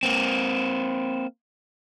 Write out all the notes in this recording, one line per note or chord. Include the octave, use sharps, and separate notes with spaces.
A#3 C4